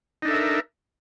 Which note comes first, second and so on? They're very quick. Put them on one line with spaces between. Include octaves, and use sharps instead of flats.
D#4 D4 A4 E5 A#4